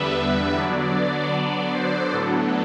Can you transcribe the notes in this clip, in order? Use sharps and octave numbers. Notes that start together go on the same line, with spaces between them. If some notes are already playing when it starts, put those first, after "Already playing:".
Already playing: E2 D3 G3 B3 D4 B4 E5
E5
D3 F#3 B3 D4 D5
D5
C5
A2 F#3 B3 D4 A4